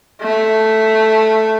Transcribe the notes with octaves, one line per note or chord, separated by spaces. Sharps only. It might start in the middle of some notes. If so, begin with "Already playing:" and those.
A3